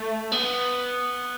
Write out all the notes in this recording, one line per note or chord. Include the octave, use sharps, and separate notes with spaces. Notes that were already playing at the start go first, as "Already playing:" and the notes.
Already playing: A3
B3